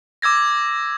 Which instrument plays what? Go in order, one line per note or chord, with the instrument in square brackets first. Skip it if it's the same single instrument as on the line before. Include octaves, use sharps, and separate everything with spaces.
[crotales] D6 E6 G#6 A#6